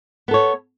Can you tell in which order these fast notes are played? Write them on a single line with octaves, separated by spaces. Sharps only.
B3 A4 C#5